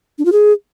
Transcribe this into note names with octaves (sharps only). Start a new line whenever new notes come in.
D4
F4
G#4